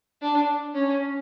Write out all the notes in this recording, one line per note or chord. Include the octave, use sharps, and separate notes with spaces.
D4
C#4